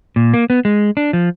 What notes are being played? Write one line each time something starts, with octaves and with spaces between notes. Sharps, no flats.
A#2
A#3
B3
G#3
D4
F3